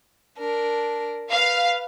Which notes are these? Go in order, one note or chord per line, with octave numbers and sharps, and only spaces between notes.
D4 A#4
B4 F5